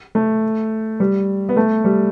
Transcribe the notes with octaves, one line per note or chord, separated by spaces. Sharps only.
A3
G3
B3
A3
G3